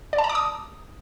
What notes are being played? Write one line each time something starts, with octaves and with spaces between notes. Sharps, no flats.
D5
A5
A#5
D6
D#6